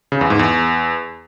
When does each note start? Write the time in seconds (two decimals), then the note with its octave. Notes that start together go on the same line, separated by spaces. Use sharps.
0.12 C#3
0.21 E2
0.30 G#2
0.39 E2